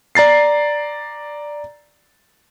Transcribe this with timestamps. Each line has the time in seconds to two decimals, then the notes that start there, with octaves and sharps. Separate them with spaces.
0.15 D5 A#5 A6 C7